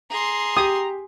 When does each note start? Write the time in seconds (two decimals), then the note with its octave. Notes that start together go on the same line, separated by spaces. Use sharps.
0.10 G#4 A#5 C6
0.57 G4 D#6